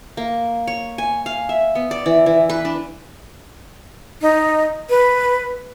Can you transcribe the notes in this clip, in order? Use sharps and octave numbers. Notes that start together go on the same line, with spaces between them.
A#3
C#5
G#5
F5
E5
B3
D5
E3
E3
B4
D4
D#4
B4